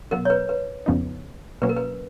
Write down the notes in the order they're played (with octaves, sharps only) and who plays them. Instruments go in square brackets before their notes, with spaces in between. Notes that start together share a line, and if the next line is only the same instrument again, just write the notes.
[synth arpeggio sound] B2 F#3 B3 [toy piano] A#4
[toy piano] C#5
B4
B4
[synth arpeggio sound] F2 C#3 F3 B3 D#4
[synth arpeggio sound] B2 F#3 A#3 C#4 [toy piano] B4
[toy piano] A#4
B4